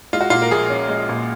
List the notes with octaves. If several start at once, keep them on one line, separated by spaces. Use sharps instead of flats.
G#3 F4
F#4
A#2 F4
A#4
A#1 G#4
C#4
G#3
A#2